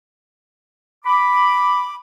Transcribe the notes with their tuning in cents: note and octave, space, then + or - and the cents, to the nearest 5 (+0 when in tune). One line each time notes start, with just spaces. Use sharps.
B5 +0 D6 +0